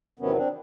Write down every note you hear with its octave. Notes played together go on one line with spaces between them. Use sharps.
E2 C3 D#3 F#3 B3 C#4
C4 D4